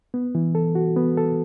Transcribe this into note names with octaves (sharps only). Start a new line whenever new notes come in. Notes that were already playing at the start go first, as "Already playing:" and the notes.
B3
E3
A4
F#4
B3
A4